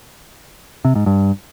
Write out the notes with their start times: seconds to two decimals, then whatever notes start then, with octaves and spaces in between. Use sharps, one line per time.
0.85 C3
0.95 G#2
1.06 G2